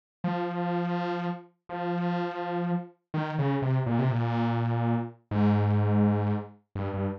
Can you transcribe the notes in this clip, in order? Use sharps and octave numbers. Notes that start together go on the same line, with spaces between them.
F3
F3
D#3
C#3
C3
A#2
C3
A#2
G#2
G2
G2